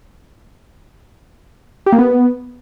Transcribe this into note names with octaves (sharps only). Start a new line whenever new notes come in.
G4
A#3
B3